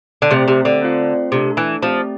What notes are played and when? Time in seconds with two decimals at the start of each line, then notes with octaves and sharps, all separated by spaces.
0.22 D3
0.31 C3 A3 C4 G4 C5 E5
0.48 C3
0.65 D3
0.81 A3 C4 F4 C5 F5
1.32 C3 A3 D4 A4
1.57 E3
1.82 F3 A3 C4 G4 D5